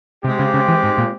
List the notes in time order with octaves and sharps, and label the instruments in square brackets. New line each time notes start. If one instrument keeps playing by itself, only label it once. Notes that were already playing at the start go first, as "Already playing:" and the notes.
[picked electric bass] C3 [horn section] G#3 C4 G4
[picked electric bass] C#3
C#3
E3
G#2
A#2